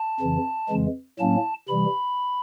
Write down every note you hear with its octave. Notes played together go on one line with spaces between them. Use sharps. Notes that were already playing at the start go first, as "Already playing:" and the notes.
Already playing: A5
F2 C#3 E3
F2 C#3 E3 G#3
A2 F#3 A#3 C#4 A5
C3 E3 G3 B5